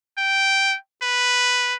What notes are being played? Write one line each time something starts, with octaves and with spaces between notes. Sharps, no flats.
G5
B4